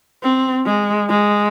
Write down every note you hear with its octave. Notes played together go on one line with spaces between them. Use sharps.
C4
G#3
G#3